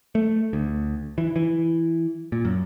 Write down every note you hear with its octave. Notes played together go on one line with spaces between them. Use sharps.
A3
D2
E3
E3
A#2
F#2